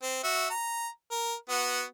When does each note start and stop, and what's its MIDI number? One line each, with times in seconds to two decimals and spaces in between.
0.02 0.23 60
0.24 0.48 66
0.24 0.48 76
0.50 0.88 82
1.11 1.34 70
1.49 1.83 59
1.49 1.83 66